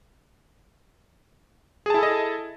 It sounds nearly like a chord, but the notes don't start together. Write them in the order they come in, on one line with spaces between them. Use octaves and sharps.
G#4 A5 E4 A4 D#5